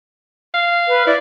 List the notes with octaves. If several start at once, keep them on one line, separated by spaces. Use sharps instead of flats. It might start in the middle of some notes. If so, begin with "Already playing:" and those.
F5
B4
E4 D5